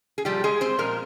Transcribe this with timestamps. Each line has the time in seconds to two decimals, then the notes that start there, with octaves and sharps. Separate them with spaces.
0.18 G#4
0.25 A#2 F3 G3 G4
0.44 G#3 G#4
0.61 C4 C5
0.78 A#2 F3 G#3 A#3 A#4